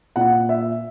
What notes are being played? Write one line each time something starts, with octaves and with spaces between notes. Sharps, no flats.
A#2 F#5
E5